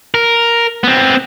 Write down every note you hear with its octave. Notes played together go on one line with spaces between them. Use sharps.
A#4
B3 C4